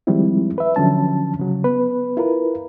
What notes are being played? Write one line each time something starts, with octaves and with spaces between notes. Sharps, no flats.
D#3 F3 G3 G#3 C4 E4
B4 E5
D3 F3 F#3 C#4 A5
C#3 F#3
B3 B4
E4 F4 A#4 B4